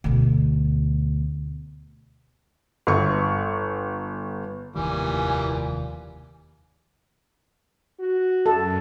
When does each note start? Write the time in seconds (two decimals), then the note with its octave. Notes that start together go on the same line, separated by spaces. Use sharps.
0.04 D2 B2
2.87 G1 C#6
4.76 F1 D#2 A#2 D#3 E3 G3 G#5
8.00 F#4
8.46 F#2 A4